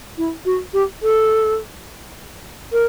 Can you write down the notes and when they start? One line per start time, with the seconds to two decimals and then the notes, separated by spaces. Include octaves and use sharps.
0.18 E4
0.45 F#4
0.74 G4
1.03 A4
2.72 A#4